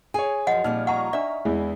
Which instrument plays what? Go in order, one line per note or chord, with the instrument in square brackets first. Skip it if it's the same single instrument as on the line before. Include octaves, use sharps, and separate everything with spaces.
[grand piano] G#4 C#5 [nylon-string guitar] G#5
[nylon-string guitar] F#2 F3 [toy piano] D#5 F#5
[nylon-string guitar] A#2 F3 G3 [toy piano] D#4 [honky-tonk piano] F6
[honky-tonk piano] D#5 A#5 C#6 [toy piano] F#5
[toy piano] D4 D5 [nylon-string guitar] E5
[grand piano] E2 [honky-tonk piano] G#3 E4